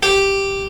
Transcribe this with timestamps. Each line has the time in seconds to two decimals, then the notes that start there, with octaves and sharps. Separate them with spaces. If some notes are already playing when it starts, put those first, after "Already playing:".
0.03 G4